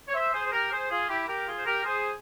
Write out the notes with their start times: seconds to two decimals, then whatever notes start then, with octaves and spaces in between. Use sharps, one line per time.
0.08 C#5
0.14 C5 E5
0.34 G#4 C5
0.45 C5
0.52 G4 A#4
0.71 G#4 C5
0.90 F4 G#4
1.09 E4 G4
1.28 G4 A#4
1.47 F4 G#4
1.57 C5
1.66 G4 A#4
1.85 G#4 C5